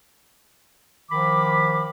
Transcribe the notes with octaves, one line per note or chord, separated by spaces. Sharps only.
D#3 F3 F5 B5 D6